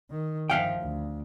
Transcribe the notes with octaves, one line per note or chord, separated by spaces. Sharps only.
D#3
G1 F3 E5 F5 G5
D2